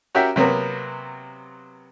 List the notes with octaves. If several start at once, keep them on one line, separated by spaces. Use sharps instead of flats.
C#4 F#4 G4 A#4 E5 G5
C3 F#3 A#3 B3